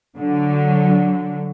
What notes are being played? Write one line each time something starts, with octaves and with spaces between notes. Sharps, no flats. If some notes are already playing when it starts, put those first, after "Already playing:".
D3 F#3